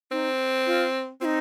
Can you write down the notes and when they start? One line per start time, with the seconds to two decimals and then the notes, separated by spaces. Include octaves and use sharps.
0.12 C4 D#4
0.66 F4
1.21 C4 D#4 F4